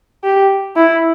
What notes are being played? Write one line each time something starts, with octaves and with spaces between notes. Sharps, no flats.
G4
E4